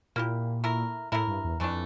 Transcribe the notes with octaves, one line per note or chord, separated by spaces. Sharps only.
A#2 A#3 E4 G4
A3 E4 A#4
A2 A3 E4 A#4
G2
E2
F2 E3 A3 D4